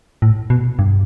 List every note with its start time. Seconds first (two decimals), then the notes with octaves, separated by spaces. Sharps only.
0.22 A2
0.50 B2
0.79 G2